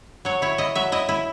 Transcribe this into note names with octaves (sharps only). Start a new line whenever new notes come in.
F#3 C#5
E4 C#5
E4 D#5
F#3 E5
E4 D#5
E4